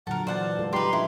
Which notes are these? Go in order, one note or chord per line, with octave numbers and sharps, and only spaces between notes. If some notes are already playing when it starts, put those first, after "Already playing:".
A#2 D3 F#3 A4 A#4 F#5
E3 C5 D5 F#5 A5
G#3 F4 A4
G3 D#4 G4 B4 A#5 C6
F3 C#4 D4 E4